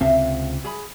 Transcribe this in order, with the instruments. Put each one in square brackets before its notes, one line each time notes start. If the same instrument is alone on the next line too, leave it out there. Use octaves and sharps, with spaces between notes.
[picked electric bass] C#2 C3 C4 [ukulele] E5 F5 A5
[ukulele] G#4 B5